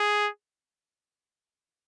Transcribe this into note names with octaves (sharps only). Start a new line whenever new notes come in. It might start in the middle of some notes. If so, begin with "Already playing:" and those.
Already playing: G#4